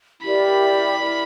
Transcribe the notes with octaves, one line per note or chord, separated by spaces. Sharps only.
E4 G4 A#4 D5 B5
E4 G4 A#4 D5